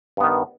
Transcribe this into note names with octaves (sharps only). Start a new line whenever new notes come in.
G2 D#3 B3